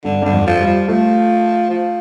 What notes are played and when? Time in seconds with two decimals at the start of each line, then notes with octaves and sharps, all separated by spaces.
0.05 G2 D3
0.22 G2 D3
0.33 F2
0.47 F3
0.60 G3
0.67 F3
0.88 F3 A3
1.70 F3